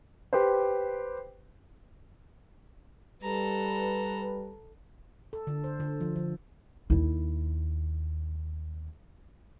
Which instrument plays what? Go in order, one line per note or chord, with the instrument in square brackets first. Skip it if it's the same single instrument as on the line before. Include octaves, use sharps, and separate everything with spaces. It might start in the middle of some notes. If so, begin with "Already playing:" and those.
[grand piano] G4 B4 C5
[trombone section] G3 B4 [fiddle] A4 A#5
[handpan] A4
D3
C5
D3
F3
F3
[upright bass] D#2 E4